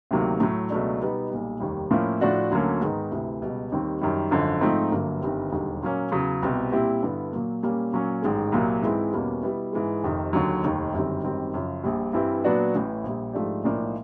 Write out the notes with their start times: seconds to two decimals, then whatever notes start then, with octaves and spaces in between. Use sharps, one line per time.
0.11 D2 C3 D#3 F#3 A#3
0.40 A2 F#3 A3
0.70 C#2 B2 F#3 A3 D4
1.00 B2 G3 B3 D#4
1.30 B1 A#2 G3
1.60 F1 D#2 D#3 G3
1.91 A2 F3 A#3 C#4 E4
2.21 A2 F3 A3 D4 F#4
2.51 D2 D3 F#3 A#3 C#4
2.81 G#2 D#3 G#3 B3 D#4
3.12 D2 C3 E3
3.42 C#2 B2 G3
3.72 D#2 D#3 G3 C4
4.02 F#2 D#3 G3
4.31 G#1 F#2 D3 F3
4.61 G#2 F3 A3 C4 D#4
4.91 G1 G2 D3 F#3 A#3
5.22 G1 G2 D#3 G3 C4
5.52 E1 D#2 D3 G3
5.83 A#2 F#3 A#3 C#4
6.12 E2 C#3 F#3
6.43 C2 B2 G3 C4
6.72 A#2 G3 C4 E4 G4
7.02 G2 D3 G3 B3 E4
7.32 A#2 F#3 A#3
7.63 A#2 G3 A#3 C#4
7.93 A#2 F#3 A#3 C#4
8.22 A1 G#2 D#3 G#3
8.52 C2 A#2 F#3 A#3
8.82 G#2 E3 G#3 C4 E4
9.13 E2 B2 G3 A#3 C#4
9.43 B2 G3 B3 E4
9.73 G#2 E3 G#3
10.03 F1 F2 C3 D#3
10.33 D#2 D3 F#3
10.63 F1 D#2 D#3
10.93 G1 F#2 D#3 G3 C4
11.23 G#1 F#2 D#3 G3 C4
11.54 F#2 C#3 F3
11.84 A#1 A#2 G3
12.13 G2 E3 G3 C4 E4
12.44 A#2 F#3 B3 D4 F#4
12.74 A1 A2 E3
13.04 A#1 A#2 G3
13.33 G#2 F3 A3 D4 G4
13.63 B1 A2 F3 A#3 D4